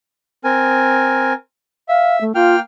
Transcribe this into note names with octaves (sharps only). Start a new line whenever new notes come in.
C4 A#4 G#5
E5 F5
A3
A#3 F4 G5 F6